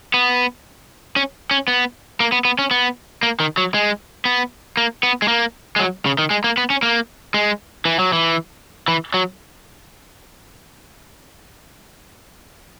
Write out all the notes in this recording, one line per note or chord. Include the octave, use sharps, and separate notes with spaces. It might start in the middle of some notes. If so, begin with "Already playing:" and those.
B3
C#4
C#4
B3
A#3
B3
B3
C#4
B3
A#3
D#3
F#3
G#3
B3
A#3
B3
G#3
A#3
G#3
F#3
C#3
D#3
G#3
A#3
B3
C#4
A#3
G#3
E3
F#3
E3
E3
F#3